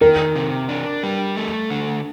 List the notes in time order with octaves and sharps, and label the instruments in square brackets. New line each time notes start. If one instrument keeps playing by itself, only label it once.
[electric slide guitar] D#3 [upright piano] A#4
[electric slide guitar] C3
D4
G3
A3
D3